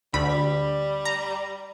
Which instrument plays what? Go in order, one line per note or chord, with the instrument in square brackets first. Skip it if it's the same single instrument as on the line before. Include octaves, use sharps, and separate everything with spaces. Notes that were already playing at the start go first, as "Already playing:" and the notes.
[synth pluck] D2 B5 [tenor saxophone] G3
[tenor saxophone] G3
[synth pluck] A#5